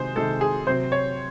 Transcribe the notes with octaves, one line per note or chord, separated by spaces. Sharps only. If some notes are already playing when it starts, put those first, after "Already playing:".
Already playing: C3 D#3 G#3 G#4 C5
C3 D#3 G#3 A4
G#4
C3 F#3 C4 C5
C#5